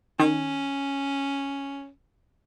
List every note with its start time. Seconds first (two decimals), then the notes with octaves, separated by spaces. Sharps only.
0.19 D#3 C#4